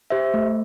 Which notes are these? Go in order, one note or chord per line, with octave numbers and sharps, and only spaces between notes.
G4 C5 E5
A3